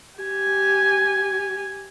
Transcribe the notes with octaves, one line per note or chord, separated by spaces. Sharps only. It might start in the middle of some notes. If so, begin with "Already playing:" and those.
G4 G#5